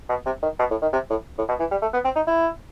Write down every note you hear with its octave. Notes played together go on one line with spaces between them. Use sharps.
B2
C3
D#3
B2
A2
D#3
C3
A2
A2
B2
E3
G3
A3
B3
C4
D#4
E4